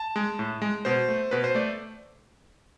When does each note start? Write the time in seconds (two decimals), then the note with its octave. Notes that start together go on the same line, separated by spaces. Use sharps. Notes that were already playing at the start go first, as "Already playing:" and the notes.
Already playing: A5
0.16 G#3
0.39 A2
0.62 G#3
0.85 B2 C5
1.08 A3
1.31 B2 B4
1.44 C5
1.55 A3 D5